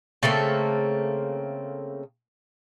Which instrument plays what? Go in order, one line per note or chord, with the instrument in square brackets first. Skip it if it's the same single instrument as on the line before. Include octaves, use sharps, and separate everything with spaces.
[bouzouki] C#3 A3 A#3 C4